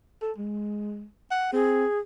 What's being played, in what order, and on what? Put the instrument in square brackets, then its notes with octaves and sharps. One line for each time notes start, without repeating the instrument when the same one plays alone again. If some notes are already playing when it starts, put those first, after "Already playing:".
[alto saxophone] A4
G#3
F#5
[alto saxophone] C4 [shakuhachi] G#4